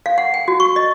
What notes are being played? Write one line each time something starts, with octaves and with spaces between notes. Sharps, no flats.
F5
F#5
G5
F#4
C#6
D#5